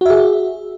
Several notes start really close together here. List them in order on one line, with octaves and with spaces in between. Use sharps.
F#4 E5 G#4